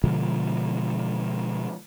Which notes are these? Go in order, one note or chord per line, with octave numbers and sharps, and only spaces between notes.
B2 D3 F3 G#3